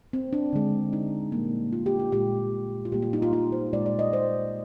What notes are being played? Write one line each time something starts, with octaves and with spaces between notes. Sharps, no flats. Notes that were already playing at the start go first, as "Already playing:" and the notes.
C4
D4
D3 G#3
D#4
A#2 G3 A#3
F4
G4
F4
A#2 G#3 G4
F4
A#2 G3 A#3 G4
F4
D#4
F4
F4
C5
A#2 G#3 D5
D5
D#5
C5